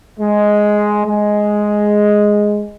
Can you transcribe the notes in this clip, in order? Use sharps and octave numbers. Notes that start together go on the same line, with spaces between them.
G#3
G#3